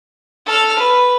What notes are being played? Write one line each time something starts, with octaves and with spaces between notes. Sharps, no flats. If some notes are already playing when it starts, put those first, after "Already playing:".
A4 F6
B4